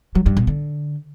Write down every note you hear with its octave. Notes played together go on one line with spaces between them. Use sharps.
F#3
G2
B2
D3